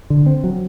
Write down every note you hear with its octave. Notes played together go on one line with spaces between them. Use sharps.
D3
C4
F#3